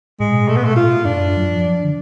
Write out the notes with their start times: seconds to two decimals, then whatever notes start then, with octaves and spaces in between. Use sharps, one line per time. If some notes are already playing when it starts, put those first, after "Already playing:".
0.20 A2 G#3
0.31 B2
0.41 A2
0.48 B2 A3
0.57 B3
0.62 A2 A3
0.73 B2 F4
0.83 A2
1.05 F#2 D4
1.37 F#3
1.48 F3
1.84 D3